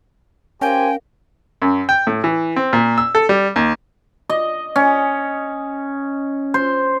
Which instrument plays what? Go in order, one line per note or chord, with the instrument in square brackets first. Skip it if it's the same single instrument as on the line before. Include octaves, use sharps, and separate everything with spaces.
[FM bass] C#4 [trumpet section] G4 C5 G#5 [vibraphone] A#4 F5 [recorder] G5
[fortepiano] F#2
G5
A2
E3
C4
A#2
E6
A4
G3
D#2
[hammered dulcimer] D#5
C#4
C5